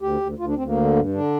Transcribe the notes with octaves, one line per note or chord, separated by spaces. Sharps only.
D2 G4
D2
D2 F4
D4
D2 C4
A#3
D3
G2
D3 D4